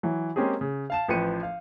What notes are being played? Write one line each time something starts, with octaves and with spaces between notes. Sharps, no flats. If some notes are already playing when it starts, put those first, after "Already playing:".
E3 F#3
G#3 A#3 C4 C#4 G4 G#4
C#3
F5 A5 E7
A1 F3 B4 G5 C#7 D#7
F5